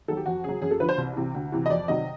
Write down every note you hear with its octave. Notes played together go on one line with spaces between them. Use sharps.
D#3 F#3 A4
G4
F2 F#4
C#3 F#3 G#4
F#2 G#4
A4
D3 F3 B4
C5
C2
C3 E3
D2
C3 E3
D#5
F2 D5
C3 D#3 F#3 D#5